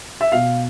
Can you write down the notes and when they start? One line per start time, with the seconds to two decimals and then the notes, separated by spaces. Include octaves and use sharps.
0.21 E5
0.32 B2 F5